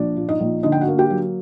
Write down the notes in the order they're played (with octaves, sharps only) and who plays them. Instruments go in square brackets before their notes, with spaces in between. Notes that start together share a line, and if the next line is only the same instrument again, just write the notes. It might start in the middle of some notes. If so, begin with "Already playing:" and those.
Already playing: [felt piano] A#1 D4 D5
A#2
D#4 D#5
A#1
D3 D#4 D#5
G5
F#4 F#5
A#3
G4 G5
F#3